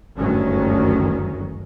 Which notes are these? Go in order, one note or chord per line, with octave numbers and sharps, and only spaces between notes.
F#1 D2 G2 D#3 F#3 C#4